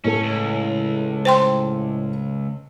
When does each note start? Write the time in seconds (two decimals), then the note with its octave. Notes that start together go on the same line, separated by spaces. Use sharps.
0.04 A2 A3 C#4 A4
0.23 C#2
1.25 C5 G5 C6